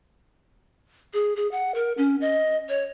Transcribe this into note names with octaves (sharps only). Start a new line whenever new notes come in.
G#4
G#4
F#5
A#4
C#4
D#5
C#5